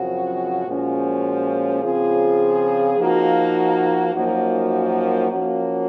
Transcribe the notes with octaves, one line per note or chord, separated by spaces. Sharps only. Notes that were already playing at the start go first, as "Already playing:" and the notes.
Already playing: F#2 C#3 F3 C4 F#4
A#2 F3 G#3 C#4 F#4
C#3 F3 C4 F4 G#4
F3 A#3 D#4 F#4
F#2 F3 A#3 D#4 F#4
F3 A#3 C#4 F#4